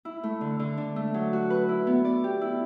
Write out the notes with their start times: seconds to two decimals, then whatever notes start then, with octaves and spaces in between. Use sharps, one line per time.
0.05 E4
0.23 A3
0.41 D3
0.59 D3
0.78 D4
0.96 A3
1.14 F#3
1.33 F#4
1.50 B4
1.69 E4
1.87 B3
2.05 D5
2.24 G4
2.41 E4